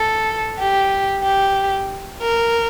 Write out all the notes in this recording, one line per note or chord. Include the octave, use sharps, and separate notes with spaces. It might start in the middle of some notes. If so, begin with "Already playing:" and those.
Already playing: A4
G4
G4
A#4